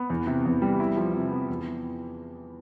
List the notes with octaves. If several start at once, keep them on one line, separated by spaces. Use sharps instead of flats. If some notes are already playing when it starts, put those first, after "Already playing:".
Already playing: B3
E2
C3
E2
G3
E4
F3
C3
B3
E2